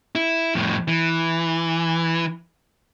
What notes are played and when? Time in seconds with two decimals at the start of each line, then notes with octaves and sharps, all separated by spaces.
0.15 E4
0.55 F2 A2
0.88 E3